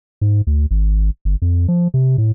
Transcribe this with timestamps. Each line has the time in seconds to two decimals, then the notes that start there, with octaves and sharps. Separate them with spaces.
0.21 G#2
0.47 D2
0.71 G#1
1.25 G1
1.42 F2
1.68 F3
1.94 C3
2.18 A2